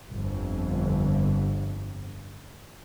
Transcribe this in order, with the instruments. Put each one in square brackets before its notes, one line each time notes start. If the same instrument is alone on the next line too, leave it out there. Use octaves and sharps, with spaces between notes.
[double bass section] G1 F2